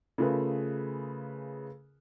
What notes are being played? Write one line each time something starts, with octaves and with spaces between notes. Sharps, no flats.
C#3 A3 F4 G#4 A#4 B4